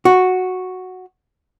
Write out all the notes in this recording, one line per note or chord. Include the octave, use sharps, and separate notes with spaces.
F#4